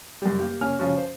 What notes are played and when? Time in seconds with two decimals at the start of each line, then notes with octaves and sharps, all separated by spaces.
0.22 F#2 G3
0.39 A#3 G4
0.61 A#3 C#4 G#5 F6
0.79 C#3 F3 C#4 F#4
0.97 C5